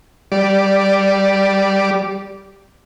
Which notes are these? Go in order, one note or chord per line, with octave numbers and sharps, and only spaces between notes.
G3 D5